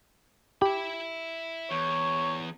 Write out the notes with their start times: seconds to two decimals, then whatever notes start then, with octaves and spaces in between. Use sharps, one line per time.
0.62 G4 E5 B5
1.71 E2 C#5